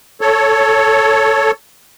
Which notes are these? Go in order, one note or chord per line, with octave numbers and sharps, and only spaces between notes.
A4 C#5